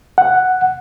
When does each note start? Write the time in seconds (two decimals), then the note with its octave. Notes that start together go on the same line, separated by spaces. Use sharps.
0.18 F#5